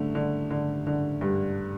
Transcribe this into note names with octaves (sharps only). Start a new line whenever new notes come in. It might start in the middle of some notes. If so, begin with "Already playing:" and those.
Already playing: D3 A3
D3
D3
D3
G2